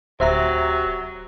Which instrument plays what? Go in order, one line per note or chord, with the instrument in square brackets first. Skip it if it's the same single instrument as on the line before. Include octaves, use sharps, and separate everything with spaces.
[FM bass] D1 [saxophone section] C3 F#3 [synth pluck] C5 E5 A#5